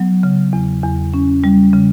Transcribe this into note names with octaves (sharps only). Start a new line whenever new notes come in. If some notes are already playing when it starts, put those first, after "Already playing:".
Already playing: F#3 B3
C#3
E2
E2
C#4
G3
C#3